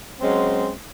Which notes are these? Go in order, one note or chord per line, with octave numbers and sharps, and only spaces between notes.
F#3 G#3 C4 C#4